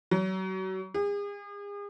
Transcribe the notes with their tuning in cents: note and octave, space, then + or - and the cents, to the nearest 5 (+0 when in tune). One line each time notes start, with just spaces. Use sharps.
F#3 +35
G#4 -40